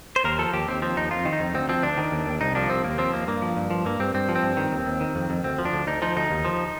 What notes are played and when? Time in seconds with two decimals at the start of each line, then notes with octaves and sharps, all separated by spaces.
0.16 C5
0.24 D#2 A#4
0.39 F3 A4
0.53 D#2 G4
0.68 D#2 C4
0.82 F3 C4
0.97 D#2 D#4
1.11 F2 F4
1.25 D#3
1.33 D#4
1.40 F2
1.54 D2 C4
1.69 F3 C4
1.83 D2 D4
1.98 D#3
2.12 D#2
2.26 D#2
2.41 C2 D#4
2.55 F3 D4
2.70 C2 C4
2.84 D#2 A#3
2.98 F3 C4
3.13 D#2 A#3
3.27 G2 A#3
3.42 F3
3.57 G2
3.71 F3
3.85 G2 A#3
4.00 G2 C4
4.14 G2 C4
4.29 F3
4.35 C4
4.43 G2
4.57 D#3
4.72 D#2
4.86 D#2
5.01 D#3
5.15 F2
5.30 F2
5.44 D2 C4
5.59 F3
5.65 D4
5.73 D2
5.87 D2 D#4
6.02 F3 D#4
6.16 D2 D#4
6.31 D#2
6.45 F3